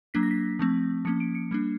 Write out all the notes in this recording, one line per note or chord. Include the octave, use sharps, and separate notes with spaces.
F#3 A#3 D4 B6
A#6
B6
F3 A3 C4
F3 A#3 C#4 C#7
D7
C#7
G3 A#3 D4